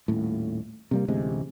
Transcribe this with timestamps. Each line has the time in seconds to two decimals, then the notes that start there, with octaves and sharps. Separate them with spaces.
0.08 D#1 A2
0.91 C3 G3 A#3
1.08 A1 D2 C3 G#3